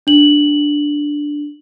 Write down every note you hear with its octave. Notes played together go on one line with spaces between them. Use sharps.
D4 F#7